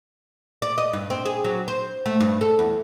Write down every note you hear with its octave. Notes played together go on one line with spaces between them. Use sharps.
D5
D#5
G2
C4
G#4
F#3
C5
A3
G2
A4
E2